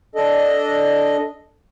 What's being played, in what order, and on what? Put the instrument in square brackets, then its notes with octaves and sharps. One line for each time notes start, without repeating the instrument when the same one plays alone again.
[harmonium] D4 A4 D#5